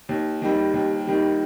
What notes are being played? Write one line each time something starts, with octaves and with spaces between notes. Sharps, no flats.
D#2
D#3 G3
D#2
D#3 G3